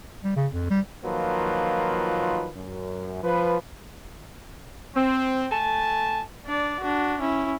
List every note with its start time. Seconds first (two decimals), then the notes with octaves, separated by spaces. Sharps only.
0.24 G3
0.37 C#3
0.53 F2
0.70 G3
1.04 D#3 F3 F#3 A#3 F4 B4
2.56 F#2
3.23 F3 B4
4.96 C4
5.51 A3 G#5 A5
6.46 D4 D5
6.80 D4 F#4
7.20 C#4 E4